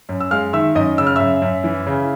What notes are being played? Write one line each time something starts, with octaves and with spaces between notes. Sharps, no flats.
F#2
E6
G#3 F5 F6
D#3 E5 E6
F#2 D#5 D#6
C#3 E6
F6
F#2 E5 E6
F#2
E3
C#3